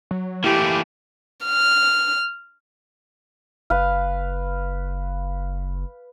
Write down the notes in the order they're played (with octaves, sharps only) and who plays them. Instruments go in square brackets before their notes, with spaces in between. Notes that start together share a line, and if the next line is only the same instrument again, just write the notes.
[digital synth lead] F#3
[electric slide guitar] E3 A3 A#3 [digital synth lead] E4 [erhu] G4
[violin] F6
[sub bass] F#1 [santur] B4 F5